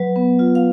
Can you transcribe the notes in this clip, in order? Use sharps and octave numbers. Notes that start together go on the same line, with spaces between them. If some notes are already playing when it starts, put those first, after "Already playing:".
Already playing: F#3 B4
B3
F4
F5